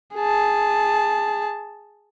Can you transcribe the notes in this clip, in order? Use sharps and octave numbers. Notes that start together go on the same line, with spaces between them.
G#4 A5